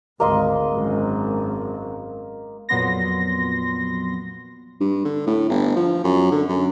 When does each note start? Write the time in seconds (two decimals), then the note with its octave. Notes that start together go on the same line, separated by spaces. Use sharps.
0.20 G#1 D2 A#3 D#5 C6
0.72 G#1 F#2
2.69 F2 A#2 F#3 B3 C6 A#6
4.80 G2
5.05 D3
5.26 A2
5.50 G1
5.76 F3
6.04 F#2
6.31 D3
6.49 F#2